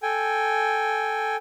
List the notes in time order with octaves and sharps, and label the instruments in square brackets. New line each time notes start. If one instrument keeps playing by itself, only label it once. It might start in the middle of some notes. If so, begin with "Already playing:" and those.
[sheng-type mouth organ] A4 G5 G#5